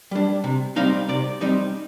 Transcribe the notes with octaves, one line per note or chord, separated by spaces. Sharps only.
G3 D4
C3
G3 C4 D#4 F5
C3 D5
G3 C4 D#4